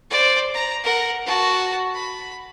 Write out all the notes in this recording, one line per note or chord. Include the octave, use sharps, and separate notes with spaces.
C5 D5
A#5
A#4 F#5
F#4 A5
B5